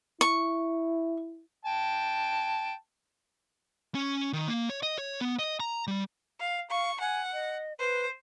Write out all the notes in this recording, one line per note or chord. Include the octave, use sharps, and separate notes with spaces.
E4 C#6
G5 A5
C#4
D#3
A#3
C#5
D#5
C#5
B3
D#5
A#5
G3
F5
F5 C#6
F#5 G#5
D#5
B4 C5